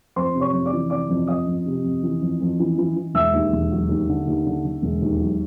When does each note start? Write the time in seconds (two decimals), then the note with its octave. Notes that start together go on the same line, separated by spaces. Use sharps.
0.16 F2 C5 C6
0.35 C3
0.40 C#5 C#6
0.53 F2
0.66 D5 D6
0.72 E3
0.90 C3 D5 D6
1.09 F2
1.28 F2 D#5 D#6
1.46 F2
1.66 C3
1.84 F2
2.03 E3
2.21 F2
2.40 F2
2.59 E3
2.78 E3
2.96 E3
3.14 E1 E5 E6
3.33 D#2
3.52 E1
3.71 F#3
3.89 D#2
4.09 D3
4.27 D#2
4.46 D3
4.65 D3
4.82 E1
5.02 D#2
5.20 F#3